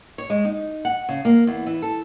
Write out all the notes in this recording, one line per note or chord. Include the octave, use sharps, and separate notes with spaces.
C#5
G#3
D#4
F#5
C#3
A#3
E2
E3
A4